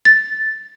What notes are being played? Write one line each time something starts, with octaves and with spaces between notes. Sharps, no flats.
A6